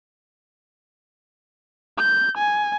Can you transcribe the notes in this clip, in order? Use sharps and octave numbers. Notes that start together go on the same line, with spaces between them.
G6
G#5